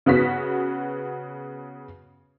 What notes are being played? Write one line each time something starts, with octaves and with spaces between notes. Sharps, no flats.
C#3 B3 F#4 B6